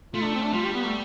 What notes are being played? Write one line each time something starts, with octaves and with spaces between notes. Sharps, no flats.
A3 F4
D4
C4
D4
G3 F4
G4
B3
A3